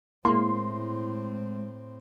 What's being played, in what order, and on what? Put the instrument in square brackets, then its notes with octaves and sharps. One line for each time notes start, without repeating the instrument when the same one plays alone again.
[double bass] A2 C4 [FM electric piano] G#3 E4 [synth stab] A#3 [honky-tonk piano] C6